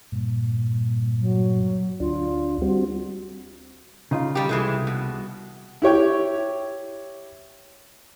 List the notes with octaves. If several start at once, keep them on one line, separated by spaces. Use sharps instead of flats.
G2 A#2
F#3
D2 D4 F4
G3 C4 F#4
C#3 D#4 F4
D#3 G3 G4
C2 E3 G#3 A3
B2
E4 G4 C#5 G5